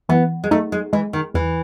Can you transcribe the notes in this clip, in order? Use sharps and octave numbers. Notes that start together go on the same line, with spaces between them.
E3 B3
G#3
A3 D#4
G#3
E3 G#3
D#3
E2 E3